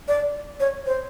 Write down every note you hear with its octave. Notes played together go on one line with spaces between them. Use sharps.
D5
C#5
C5